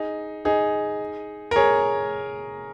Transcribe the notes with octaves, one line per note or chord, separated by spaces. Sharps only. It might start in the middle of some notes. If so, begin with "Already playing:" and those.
Already playing: D#4 G#4
D#4 G#4
A#4
G#4 C#5